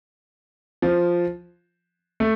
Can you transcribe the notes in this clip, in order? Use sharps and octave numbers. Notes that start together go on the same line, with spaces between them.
F3
A3